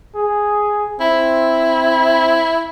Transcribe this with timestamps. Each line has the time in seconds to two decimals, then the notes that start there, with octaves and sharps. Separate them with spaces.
0.15 G#4
1.00 C4 E4